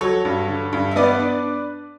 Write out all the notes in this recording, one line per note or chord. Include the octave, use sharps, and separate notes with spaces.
F#3 A4 C#5
G2
D3
G2
E5
B3 B4 D5
D4